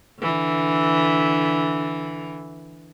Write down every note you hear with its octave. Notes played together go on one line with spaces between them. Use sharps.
D3 E3